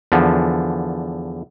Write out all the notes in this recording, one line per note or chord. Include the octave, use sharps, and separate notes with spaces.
E2 D3 F3